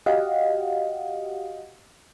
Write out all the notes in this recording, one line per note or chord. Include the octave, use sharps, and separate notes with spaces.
F#4 G4 D#5 F5 F#5